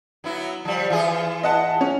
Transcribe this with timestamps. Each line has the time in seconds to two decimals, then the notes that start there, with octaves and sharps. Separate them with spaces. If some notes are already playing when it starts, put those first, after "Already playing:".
0.24 F#3 B3 E4
0.65 F3 G3
0.90 E3 F4 G#4
1.43 D#5 F#5 A5
1.81 C#4